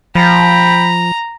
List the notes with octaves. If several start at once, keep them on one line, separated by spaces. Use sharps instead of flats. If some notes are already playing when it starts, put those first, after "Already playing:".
F3 G5 A#5 B5